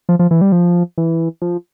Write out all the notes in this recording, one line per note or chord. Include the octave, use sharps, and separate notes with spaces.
F3
F3
E3
G3
F3
E3
F3